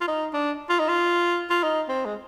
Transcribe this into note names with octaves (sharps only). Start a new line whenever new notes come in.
F4
D#4
D4
F4
D#4
F4
F4
D#4
C4
G#3